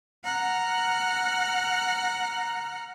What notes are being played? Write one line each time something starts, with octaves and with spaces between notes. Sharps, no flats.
F#5 A#5 F6 F#6